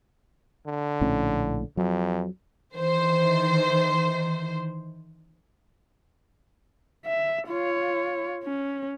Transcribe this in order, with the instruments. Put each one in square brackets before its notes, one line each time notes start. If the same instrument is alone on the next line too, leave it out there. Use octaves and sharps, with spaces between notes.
[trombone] D3
[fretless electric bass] A#1 A2 C#4
[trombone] F2 [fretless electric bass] F#3
[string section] D#3 E3 C5
[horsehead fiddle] E5
F4 C#5
C#4